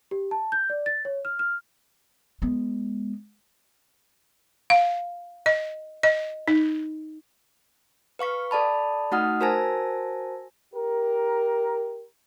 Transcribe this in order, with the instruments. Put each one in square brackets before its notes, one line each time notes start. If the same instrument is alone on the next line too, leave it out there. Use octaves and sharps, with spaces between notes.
[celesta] G4
A5
G6
D5
A6
C#5
F6
F6
[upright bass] G#3 B3
[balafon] F5
D#5
D#5
D#4
[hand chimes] B4 F5 C#6 B6
A4 D5 A5 B5
A3 D#4 F#4 F#5 D#6 F6
F#4 A#4 C5 G#5 A5 A#6
[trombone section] G4 A#4